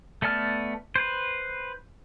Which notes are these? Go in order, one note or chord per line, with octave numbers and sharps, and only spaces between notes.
A3 B3 D5 A5 F6
B4 C5